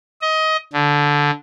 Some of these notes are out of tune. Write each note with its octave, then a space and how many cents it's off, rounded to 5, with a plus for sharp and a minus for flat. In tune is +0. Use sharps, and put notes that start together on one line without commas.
D#5 +20
D3 -10